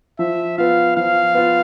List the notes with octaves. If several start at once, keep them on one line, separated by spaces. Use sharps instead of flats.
F3 E5
B3 F4 F5
F3 F5
B3 F4